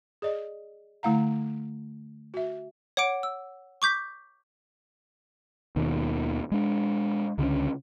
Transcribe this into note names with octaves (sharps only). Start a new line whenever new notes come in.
G#4 D5 D#5
D3 A3 E4 F5 F#5 A#5
F#4 E5
C#5 F#5 D6 D7
E6
C#6 D6 G6 B6
D#2 B2 D#3
G#3 D4
C#2 D3 D#3 C#4